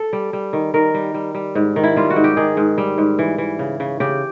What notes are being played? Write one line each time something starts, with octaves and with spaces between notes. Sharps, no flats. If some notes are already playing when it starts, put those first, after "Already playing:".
Already playing: A4
G3
G3
D#3
D#3 A#4
G3
G3
G3
G#2
D#3
E4
G3 F4
F#4
G#2
G4
D#3 G#4
G#2
G3
G#2
E3
E3
C#3
C#3
C#3 G4